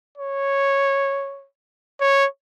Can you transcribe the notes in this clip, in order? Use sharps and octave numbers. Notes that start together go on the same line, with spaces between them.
C#5
C#5